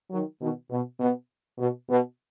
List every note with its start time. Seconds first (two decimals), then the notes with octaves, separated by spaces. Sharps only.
0.11 D#3 F#3
0.41 B2 D#3
0.71 B2
1.00 B2
1.59 B2
1.89 B2